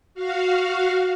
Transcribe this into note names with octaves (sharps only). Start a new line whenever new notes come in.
F#4 F5